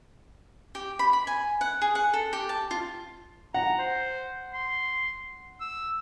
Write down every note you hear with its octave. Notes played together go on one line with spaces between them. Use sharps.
G4
B5
B5
G#5
F#5
G#4
F#5
A4
G4
A5
F4
F#5 A#5
C5
C6
E6